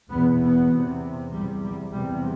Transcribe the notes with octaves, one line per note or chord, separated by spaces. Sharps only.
E2 B2 B3
B3
E2 C3
E2 C3 G3
G3
E2 C3 G3